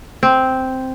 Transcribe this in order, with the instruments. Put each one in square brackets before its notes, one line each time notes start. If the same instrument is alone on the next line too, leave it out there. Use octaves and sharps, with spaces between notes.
[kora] C4